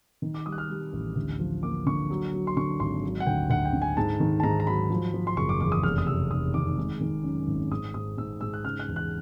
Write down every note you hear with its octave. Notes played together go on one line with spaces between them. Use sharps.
D#3
D6
G3 D#6
F#6
F6
G3
A1
D2
F3
A#3 D6
D3 C#6
F#3
F#3
C6
D3 C#6
G#1 C6
F#3
F#5
D2 G5
D2 F#5
G5
D3
G#5
G#2 A5
D#3
A5
G#2 A#5
A#5
F#3 B5
F3
F3
C6
F#1 C#6
D6
E2 D6
D#6
F1 F6
D#6
C3 E6
F1 D#6
D#3 D6
G#3
D#3
F#2
G#1
G#2 D#6
G#2 D#6
G#2 E6
G#2 E6
F#6
C#3 F6
F#6
E2
F#6